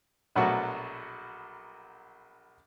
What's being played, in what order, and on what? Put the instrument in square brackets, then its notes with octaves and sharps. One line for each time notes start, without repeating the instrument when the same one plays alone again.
[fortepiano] A#1 B2 F#3 A3 F#4